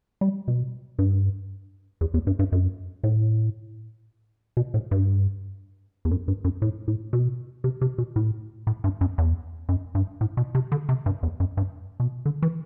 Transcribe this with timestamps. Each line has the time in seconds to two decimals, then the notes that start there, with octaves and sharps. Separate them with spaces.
0.21 G3
0.48 B2
0.99 G2
2.01 E2
2.14 E2
2.27 G2
2.39 G2
2.52 F#2
3.04 A2
4.57 B2
4.74 A2
4.91 G2
6.05 E2
6.11 F#2
6.28 G2
6.44 F#2
6.62 A2
6.88 A2
7.13 B2
7.64 C3
7.81 C3
7.98 B2
8.16 A2
8.67 A2
8.84 G2
9.01 F#2
9.18 E2
9.69 F#2
9.95 G2
10.21 A2
10.37 B2
10.55 C3
10.72 D3
10.89 C3
11.06 G2
11.23 E2
11.40 F#2
11.57 G2
12.00 B2
12.26 D3
12.42 E3